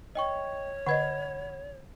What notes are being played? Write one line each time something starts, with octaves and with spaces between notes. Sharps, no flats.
C#5 D#5 G5 C#6
D3 B4 D#5 F#5 B5 G#6